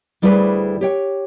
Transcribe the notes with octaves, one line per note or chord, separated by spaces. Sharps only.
D2 G3 E4 G#4 B4 C5
G4 C#5 G5